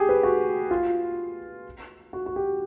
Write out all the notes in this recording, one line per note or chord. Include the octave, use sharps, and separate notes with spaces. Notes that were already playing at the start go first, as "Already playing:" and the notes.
Already playing: G4 G#4
B4
F#4
F4
F#4
F#4
G4